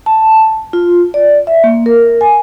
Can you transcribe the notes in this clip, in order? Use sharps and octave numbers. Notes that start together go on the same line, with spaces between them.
A5
F4
D5
E5
A#3
A#4
G#5